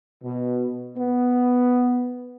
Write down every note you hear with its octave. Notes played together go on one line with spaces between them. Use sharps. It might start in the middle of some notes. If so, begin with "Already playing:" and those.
B2
B3